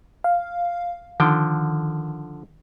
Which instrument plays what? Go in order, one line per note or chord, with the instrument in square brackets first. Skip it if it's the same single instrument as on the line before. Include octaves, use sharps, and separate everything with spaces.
[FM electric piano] F5
[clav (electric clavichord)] D3 F3 G5 [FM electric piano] D#3